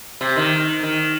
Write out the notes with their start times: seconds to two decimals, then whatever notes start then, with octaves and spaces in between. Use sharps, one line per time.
0.21 C3
0.36 D#3
0.83 D#3